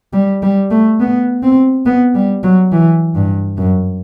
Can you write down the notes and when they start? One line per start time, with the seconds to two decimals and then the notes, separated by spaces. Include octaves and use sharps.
0.13 G3
0.42 G3
0.71 A3
1.00 B3
1.43 C4
1.86 B3
2.15 G3
2.43 F#3
2.72 E3
3.15 G2
3.58 F#2